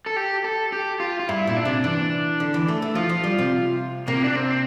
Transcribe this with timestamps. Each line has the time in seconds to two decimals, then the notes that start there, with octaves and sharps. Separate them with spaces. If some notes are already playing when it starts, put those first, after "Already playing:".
0.06 A4
0.16 G4
0.44 A4
0.72 G4
1.00 F4
1.19 F4
1.28 G2 E4
1.47 A#2 E4
1.57 D4
1.65 C3
1.84 E3 D4
2.40 D3
2.54 E3
2.68 A3
2.82 A3
2.95 F3 F4
3.09 F3
3.24 G3
3.38 C3
4.08 C3 A#3
4.24 D4
4.36 C4